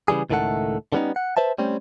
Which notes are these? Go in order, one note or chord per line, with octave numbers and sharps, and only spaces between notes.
C#3 E3 G3 G#4
C#2 A2 D#3 A3 A4 F#5
D3 G3 B3 C#4 D#4
F#5
B4 C5 E5 A5
G3 A3 C4 C#4